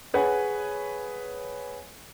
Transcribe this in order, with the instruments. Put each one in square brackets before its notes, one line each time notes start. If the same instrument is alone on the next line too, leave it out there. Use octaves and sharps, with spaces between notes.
[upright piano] G#4 B4 C#5 F#5 G#5